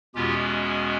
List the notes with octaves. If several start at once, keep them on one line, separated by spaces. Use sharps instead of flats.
E2 B2 G#3 C#4 F4 G4